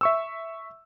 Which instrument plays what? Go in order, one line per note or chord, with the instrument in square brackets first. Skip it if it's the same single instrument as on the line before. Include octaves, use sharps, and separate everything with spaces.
[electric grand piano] E5 C#6 E6